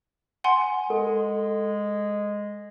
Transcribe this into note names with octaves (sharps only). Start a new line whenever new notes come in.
F#5 G#5 C6
G#3 A4